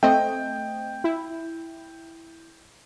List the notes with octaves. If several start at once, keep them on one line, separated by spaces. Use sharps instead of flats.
A3 C4 D#5 G5
E4